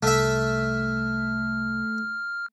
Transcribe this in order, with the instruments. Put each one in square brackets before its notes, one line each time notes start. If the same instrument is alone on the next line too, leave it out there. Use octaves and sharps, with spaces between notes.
[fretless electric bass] C2 [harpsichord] A3 E5 [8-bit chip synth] F6